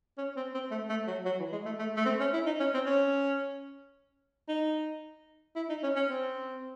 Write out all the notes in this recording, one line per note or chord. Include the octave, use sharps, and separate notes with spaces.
C#4
C4
C4
A3
A3
F#3
F#3
E3
G#3
A3
A3
A3
C4
C#4
E4
D#4
C#4
C4
C#4
D#4
E4
D#4
C#4
C#4
C4